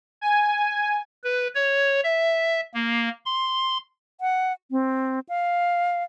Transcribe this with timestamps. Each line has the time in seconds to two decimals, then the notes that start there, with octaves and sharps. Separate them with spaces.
0.21 G#5
1.24 B4
1.55 C#5
2.04 E5
2.74 A#3
3.26 C6
4.21 F#5
4.71 C4
5.29 F5